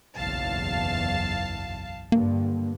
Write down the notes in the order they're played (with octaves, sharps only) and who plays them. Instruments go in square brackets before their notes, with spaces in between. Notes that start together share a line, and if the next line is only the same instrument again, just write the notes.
[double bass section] F#1 B1 E2 [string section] F5 A5
[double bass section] G2 D3 [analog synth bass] A#3